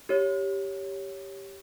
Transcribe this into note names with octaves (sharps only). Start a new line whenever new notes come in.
G4 C#5